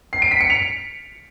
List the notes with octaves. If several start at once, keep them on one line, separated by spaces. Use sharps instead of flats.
C7
D7
B6
C#7
F7